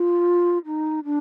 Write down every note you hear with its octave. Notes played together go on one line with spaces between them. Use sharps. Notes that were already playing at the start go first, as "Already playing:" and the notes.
Already playing: F4
D#4
D4